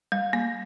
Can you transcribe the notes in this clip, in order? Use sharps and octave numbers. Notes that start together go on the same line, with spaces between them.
G3
A#3